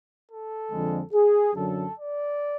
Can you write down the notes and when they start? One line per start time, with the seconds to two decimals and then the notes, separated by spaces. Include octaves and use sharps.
0.29 A4
0.71 F2 D3 F3 G#3
1.13 G#4
1.54 F#2 D3 F#3 A4
1.98 D5